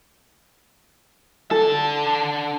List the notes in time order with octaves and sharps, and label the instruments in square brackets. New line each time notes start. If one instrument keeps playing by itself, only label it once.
[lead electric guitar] D3 A5 [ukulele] A4